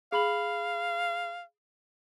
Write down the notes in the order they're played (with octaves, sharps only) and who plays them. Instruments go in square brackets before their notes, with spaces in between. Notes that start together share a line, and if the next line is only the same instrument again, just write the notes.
[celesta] G#4 B5 F#7 [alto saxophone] F5